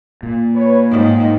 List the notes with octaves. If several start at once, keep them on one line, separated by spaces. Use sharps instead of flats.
A#2
B4 C#5
G#2 D#3 D#4